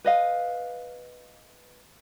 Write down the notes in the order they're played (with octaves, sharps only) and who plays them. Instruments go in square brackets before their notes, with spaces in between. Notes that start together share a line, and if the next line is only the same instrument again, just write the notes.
[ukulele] B4 D#5 F5